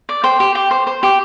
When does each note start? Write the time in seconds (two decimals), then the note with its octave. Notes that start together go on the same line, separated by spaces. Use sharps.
0.09 D5
0.24 C5 G5
0.40 G4
0.55 G4
0.71 C5
0.87 C5
1.03 G4